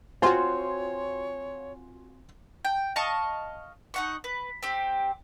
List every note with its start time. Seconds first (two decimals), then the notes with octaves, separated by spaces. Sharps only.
0.22 C4 F4 F#4 C#5 G#5 C6
2.65 G5
2.96 D#5 F5 A5 C#6
3.94 D#4 F#5 C#6
4.24 B4
4.63 C4 G4